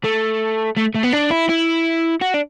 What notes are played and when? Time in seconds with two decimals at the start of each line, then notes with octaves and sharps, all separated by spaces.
0.04 A3
0.77 A3
0.95 A3
1.04 B3
1.13 D4
1.31 E4
1.49 E4
2.21 F#4
2.34 D4